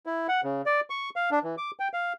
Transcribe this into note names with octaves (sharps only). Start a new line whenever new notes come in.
E4
F#5
C#3
D5
C#6
F5
D4
E3
D6
G5
F5